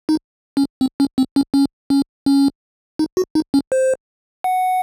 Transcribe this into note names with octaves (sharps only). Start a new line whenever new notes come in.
D#4
C#4
C4
C#4
C4
C#4
C#4
C#4
C#4
D#4
F#4
D#4
C#4
C5
F#5